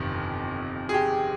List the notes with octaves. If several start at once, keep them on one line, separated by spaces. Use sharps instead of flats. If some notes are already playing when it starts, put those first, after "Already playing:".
Already playing: G1 F2 C3 D#3
G#4
G4